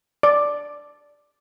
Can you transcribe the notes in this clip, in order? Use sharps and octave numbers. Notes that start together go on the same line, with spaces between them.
D5